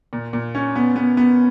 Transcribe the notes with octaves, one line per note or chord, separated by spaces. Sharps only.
A#2
A#2
C#4
B3
B3
B3